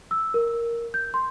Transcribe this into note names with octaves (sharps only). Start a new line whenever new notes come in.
E6
A#4
G6
C6